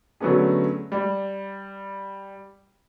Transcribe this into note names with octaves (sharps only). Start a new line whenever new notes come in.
D3 F#3 A3 B3 C#4 G#4
G3